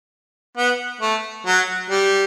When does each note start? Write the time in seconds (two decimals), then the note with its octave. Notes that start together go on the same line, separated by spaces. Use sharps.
0.57 B3
1.01 A3
1.46 F#3
1.90 G3